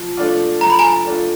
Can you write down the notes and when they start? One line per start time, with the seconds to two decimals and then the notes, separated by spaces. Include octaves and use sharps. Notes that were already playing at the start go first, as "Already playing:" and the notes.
Already playing: F3
0.17 A3 D4 F4
0.61 F3 A#5
0.70 B5
0.79 G#5 A#5
1.05 A3 D4 F4